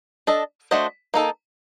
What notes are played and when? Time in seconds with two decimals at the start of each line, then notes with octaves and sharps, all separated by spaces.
0.27 D4 A4 D#5
0.71 A3 D4 F#4 C5 D#5
1.14 A#3 D#4 A4